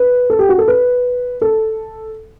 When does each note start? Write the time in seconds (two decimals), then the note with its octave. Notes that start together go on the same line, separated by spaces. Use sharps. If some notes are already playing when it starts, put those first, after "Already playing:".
Already playing: B4
0.30 A4
0.39 G4
0.49 F#4
0.58 A4
0.68 B4
1.41 A4